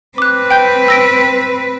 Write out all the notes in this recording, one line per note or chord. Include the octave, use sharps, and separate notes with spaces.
C4 B4 D6 F#6
G5 G6
E6 A#6 D7